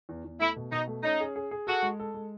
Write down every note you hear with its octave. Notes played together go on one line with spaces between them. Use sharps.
E2
E2
A3 E4
B2
B2 D#4
A3
C#4 D#4
G#4
G#4
G#4
F#4 A4
G#3
A4
G#3